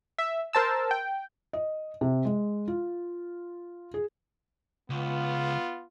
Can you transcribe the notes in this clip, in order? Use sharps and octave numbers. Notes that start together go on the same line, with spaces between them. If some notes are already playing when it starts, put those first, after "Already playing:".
E5
A#4 C5 A5 E6
G5
D#5
C3
G#3
F4
G#4
C#2 B3 F4